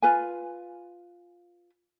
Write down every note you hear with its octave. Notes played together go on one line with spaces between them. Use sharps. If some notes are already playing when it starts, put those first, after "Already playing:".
F4 B4 G#5